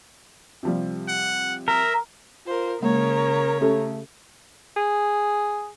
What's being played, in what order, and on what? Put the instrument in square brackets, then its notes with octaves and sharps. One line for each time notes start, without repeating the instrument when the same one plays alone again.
[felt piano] C3 F3 G3
[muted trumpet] F#5
[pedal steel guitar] A#4 [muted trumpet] E5
[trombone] F4 [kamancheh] A#4 C5
[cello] C#3 [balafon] G#3 A#3 [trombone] A#4 [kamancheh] C#5 A#5
[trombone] A3 [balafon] C#4 G4 A4
[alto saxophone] G#4